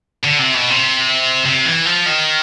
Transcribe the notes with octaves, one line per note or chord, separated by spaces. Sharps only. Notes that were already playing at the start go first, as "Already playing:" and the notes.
D3
C3
B2
C3
C3
E3
F3
D#3